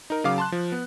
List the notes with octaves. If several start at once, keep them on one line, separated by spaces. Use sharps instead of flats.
D#4 A#4
C#3 F#3 F5 D6
A5 C6 F#6
F3
B3